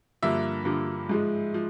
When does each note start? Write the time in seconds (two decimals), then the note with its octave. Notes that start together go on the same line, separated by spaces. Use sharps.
0.23 G2 D3 F3 A#3 E5
0.65 G2 D3 F3 A#3
1.09 G#2 F3 G#3
1.54 F3